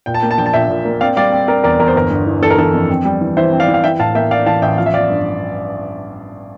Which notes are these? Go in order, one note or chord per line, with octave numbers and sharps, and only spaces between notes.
A#2 G5
A5
A#3 G5
A5
A#1 G5
A5
A#2 E5 G5
A#2
A#3
C4 D5 F5
G3 D5 F5
C4
C4 A#4 D5
E2 A#4 D5
E2 A#4
C5
G1 A#4
G1
E3
E3 A4
A#4
E3 A4
F2
C4
G3
E3
E3 C5 E5
C4
D5 F5
E3
F5
E3 E5 G5
A2 F5 A5
A#3 E5 G5
A1 D5 F5
E3 F5 A5
A1 E5 G5
F3 F5
E5
F3 D5 F5
G2